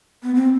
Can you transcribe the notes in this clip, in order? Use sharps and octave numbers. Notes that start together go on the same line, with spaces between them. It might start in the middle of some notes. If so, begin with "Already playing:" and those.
B3
C4